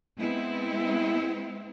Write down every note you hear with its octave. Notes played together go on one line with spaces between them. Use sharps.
G#3 B3 C4 E4